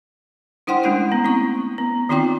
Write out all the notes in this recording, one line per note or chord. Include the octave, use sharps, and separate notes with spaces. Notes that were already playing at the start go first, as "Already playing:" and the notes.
D4 E4 C5 F#5 G5 C6
G#3 A3 C#4 E4 F#5 G5
A3 B3
C4 E4 C#6
B3
D#3 C4 D#4 F4 G5 D6